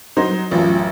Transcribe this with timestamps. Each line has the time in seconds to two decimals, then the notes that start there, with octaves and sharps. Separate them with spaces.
0.17 F#3 D#4 C5
0.51 A1 F#2 F4